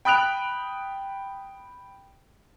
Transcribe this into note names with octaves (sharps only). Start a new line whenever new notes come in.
G5 B5 D#6 F#6 D7 F7